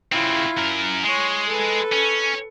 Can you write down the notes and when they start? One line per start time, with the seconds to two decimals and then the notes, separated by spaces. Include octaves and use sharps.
0.12 C#3 C4 E4 F4
0.57 F#2 A#4
1.03 G#3 C#5 C6
1.47 A4 B4
1.93 C#4